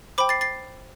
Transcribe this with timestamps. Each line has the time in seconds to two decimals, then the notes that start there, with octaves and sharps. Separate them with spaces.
0.18 C5 G5 B5 D6
0.29 A6 C7
0.41 A6 C7